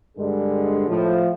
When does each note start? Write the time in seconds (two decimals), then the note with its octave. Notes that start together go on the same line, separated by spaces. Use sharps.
0.18 G2 D3 G3 G#3
0.88 A2 F3